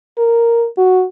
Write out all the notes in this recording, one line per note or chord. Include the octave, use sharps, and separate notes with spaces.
A#4
F#4